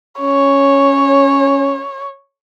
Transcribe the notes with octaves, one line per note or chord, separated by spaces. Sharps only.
C#4 C#5